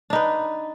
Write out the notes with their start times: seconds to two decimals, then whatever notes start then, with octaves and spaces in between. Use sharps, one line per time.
0.10 D4
0.13 D#4
0.15 B4